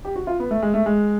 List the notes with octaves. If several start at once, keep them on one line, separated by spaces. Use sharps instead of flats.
G4
F#4
F4
B3
A3
G#3
A3
G#3